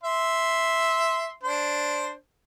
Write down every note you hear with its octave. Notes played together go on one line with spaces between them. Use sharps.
E5 C6
D4 C5